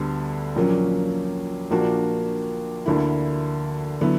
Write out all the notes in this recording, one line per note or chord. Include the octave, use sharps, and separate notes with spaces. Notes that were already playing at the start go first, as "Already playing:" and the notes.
Already playing: D2 D3 G3 B3
A#1 A#2 F#3 A#3 C#4
A#1 A#2 A#3 D4 F#4
D2 D3 A#3 E4
D3 F#3 B3 E4